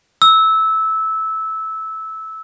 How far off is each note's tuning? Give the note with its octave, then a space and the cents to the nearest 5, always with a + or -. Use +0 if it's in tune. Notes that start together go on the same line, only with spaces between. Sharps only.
E6 -15